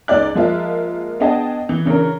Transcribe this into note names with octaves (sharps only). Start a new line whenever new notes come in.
C#2 D#4 D5 F#6
F3 G#3 A#3 F4 E5
B3 D4 G#4 D#5 G5 A5
E3
C#3 E3 D4 A#4